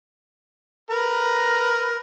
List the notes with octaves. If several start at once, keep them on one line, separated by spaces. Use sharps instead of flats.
A#4 B4 A#5